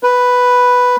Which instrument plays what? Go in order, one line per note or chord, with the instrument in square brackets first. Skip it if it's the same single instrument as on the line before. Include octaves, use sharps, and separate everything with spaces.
[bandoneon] B4